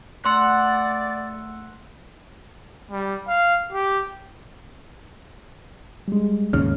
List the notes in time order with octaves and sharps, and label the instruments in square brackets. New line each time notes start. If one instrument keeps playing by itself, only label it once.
[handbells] A3 E6 C#7 [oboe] D5 [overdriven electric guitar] F#5 [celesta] C6
[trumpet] G3
F5
G4
[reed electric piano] G3 G#3
[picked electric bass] D#2 G#2 C#3 [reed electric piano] F6